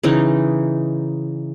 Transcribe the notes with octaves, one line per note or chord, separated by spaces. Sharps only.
C#3 E3 D#4